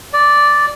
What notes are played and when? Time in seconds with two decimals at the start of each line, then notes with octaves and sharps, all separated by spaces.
0.13 D5